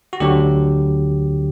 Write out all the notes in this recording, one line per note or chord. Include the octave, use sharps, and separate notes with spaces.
F#4
D2 D3 F#3 G4